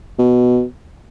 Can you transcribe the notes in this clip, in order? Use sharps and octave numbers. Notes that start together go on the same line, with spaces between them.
B2